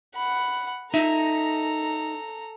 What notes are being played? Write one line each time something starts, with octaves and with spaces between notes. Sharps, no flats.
F#5 B5
D#4 A4 E5 A#5